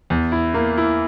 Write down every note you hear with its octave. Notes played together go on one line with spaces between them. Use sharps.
E2
E4
A#3
E4